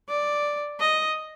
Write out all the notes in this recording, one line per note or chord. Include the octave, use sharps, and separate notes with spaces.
D5
D#5